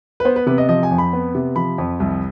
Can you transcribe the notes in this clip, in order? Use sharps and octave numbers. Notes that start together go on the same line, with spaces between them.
B4
B3 C5
B4
C3 B4
D#5
F3 D#5
G#5
F2
B5
B3
C3
F3 B5
F2
C2